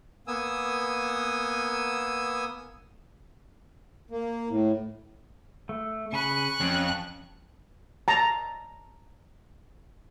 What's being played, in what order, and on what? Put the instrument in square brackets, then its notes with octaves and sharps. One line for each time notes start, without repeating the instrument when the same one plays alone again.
[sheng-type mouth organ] A#3 B3 G#5 D#6 E6
[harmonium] A#3
A2
[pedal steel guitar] A3
[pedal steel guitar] C#3 G#5 B5 [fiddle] C#6 F#6
[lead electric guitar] F2 [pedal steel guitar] C#4
[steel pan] A5 A#5